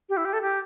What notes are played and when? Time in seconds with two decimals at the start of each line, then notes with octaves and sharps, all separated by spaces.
0.09 G4
0.17 E4
0.25 G4
0.33 A4
0.42 G4